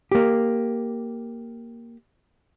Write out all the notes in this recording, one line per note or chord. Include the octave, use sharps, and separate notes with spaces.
A#3 G4